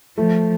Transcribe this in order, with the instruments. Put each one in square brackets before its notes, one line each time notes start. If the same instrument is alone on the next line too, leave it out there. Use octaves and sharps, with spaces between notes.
[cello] F3 [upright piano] A3